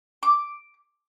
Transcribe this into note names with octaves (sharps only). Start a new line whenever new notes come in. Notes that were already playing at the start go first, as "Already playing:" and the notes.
D6